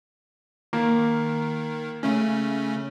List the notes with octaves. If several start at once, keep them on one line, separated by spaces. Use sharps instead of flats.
D#3 A#3
C#3 A3 C#4